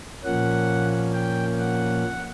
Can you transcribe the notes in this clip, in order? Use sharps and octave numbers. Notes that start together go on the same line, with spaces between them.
A#2 F3 A#3 C#4 F#5
G5
F#5